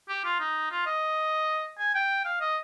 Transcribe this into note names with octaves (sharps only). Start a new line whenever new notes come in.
G4
F4
D#4
F4
D#5
G#5
G5
F5
D#5